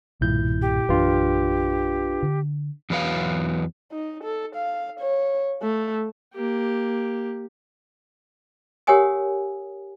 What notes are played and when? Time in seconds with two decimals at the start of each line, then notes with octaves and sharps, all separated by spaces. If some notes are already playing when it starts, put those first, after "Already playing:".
0.21 B1 G2 A#2 D#3 E4 G6
0.61 G4
0.89 A#1 F#2 E3 D4 F4 B4
2.23 D3
2.90 E2 F#3 B4 F5
3.92 D#4
4.24 A4
4.55 F5
5.00 C#5
5.62 A3
6.34 A#3 G4
8.87 G4 A#4 C#5 F#5 G#5 D#6